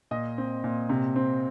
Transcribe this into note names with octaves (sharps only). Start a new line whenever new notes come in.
A#2 D#5
C4
A#2
C3
C4